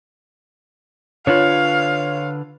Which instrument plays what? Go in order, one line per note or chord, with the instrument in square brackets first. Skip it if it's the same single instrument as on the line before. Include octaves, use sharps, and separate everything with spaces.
[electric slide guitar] D3 D4 B4 [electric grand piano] F4 C#5 [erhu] F5